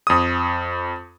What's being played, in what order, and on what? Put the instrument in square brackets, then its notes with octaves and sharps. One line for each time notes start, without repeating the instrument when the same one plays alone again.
[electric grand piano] F2 D#6